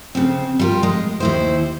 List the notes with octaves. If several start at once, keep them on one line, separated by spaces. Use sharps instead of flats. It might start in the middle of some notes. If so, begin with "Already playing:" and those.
C#3 C4
G3 F4 A#4
G#3
D#2 E4 C5